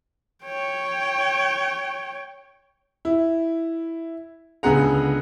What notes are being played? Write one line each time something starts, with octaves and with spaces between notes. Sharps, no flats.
C#5 G5
E4
C#2 D3 B3 G#4 F#5 A#5